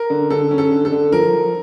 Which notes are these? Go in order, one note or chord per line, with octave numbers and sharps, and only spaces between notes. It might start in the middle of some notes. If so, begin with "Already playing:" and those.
Already playing: A#4
D3
D3 A4
C#4
A4
D3
A4
D3
F3 A#4
F3